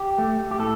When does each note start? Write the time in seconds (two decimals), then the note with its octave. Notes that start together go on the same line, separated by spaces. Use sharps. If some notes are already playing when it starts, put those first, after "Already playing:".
Already playing: G4
0.18 A3
0.51 G4
0.59 A2 A4